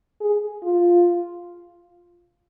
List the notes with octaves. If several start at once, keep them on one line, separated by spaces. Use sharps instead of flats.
G#4
F4